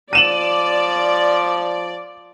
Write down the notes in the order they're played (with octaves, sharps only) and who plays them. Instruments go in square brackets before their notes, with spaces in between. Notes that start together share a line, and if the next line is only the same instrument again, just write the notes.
[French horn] F3 [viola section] D5 [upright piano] D#7 E7 F#7